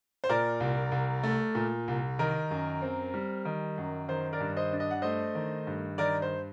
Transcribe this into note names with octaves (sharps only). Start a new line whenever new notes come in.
C5
A#2 A#4 D5
C2
C2
A3
A#2
C2
D#3 A#4
F#2
C4
G3
D#3
F#2
D#3 C5
A#4 D5
G2
C5 D#5
D4
D#5
F#5
A3 C5 D#5
D#3
G2
D#3 A#4 D5
C5